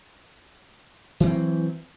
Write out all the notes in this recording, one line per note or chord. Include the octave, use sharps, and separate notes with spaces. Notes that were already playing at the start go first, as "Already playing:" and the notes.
E3 F#3 C4 D4